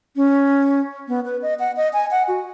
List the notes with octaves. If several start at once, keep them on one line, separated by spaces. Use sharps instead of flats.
C#4
B3
B4
D#5
F#5
D#5
G#5
F#5
F#4